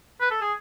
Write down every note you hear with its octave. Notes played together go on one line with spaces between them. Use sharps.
B4
A4
G#4